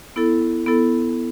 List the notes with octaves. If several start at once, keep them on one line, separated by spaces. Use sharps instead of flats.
B3 E4 A4
B3 E4 A4